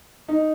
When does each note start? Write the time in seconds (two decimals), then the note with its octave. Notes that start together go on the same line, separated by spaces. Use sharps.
0.28 D#4